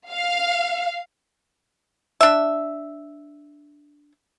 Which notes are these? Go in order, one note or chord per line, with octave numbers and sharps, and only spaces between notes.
F5
D4 E5